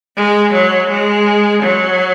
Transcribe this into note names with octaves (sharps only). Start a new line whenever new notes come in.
G#3
F#3
G#3
F#3